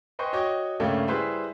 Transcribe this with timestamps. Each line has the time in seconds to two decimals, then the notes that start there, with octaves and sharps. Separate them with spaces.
0.19 B4 C5 D#5 G5 G#5 C#6
0.33 F#4 C#5 D#5 G5 C#6 D6
0.80 G2 C#3 A3 A#3 C#5 G5
1.08 G3 E4 G#4 B4 C5 E5